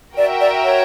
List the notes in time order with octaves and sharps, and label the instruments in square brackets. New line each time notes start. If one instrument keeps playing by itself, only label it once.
[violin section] F#4 A#4 E5 G5 [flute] D5
[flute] D5
C#5